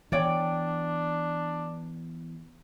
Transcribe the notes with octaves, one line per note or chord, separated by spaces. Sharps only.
E3 B3 D4 C#5 D5 G5